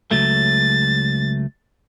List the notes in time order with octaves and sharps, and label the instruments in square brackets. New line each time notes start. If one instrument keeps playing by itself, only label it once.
[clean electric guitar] C#2 F#3 A3 [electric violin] A6